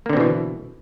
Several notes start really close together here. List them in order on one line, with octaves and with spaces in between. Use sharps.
A#3 D3 C4 B2 E3